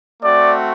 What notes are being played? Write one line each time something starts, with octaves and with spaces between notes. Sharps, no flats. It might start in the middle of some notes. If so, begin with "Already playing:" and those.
A3 C4 F#4 D5